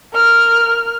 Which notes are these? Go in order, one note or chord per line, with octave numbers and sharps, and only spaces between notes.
A#4 F6